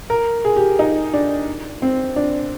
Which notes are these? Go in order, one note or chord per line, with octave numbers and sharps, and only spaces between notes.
A#4
G#4
G4
D#4
D4
C4
D4